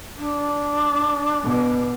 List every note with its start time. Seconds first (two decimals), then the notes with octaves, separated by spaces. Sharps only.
0.17 D4
1.44 B2